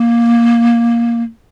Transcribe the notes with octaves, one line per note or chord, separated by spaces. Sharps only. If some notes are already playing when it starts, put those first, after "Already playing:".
Already playing: A#3